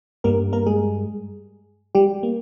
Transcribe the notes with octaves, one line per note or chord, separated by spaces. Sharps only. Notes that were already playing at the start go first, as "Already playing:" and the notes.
G2 G3 A#3 A#4
A#3 A#4
G#3 G#4
G3 G4
A#3